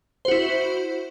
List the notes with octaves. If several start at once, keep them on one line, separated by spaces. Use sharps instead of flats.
E4 F#4 C5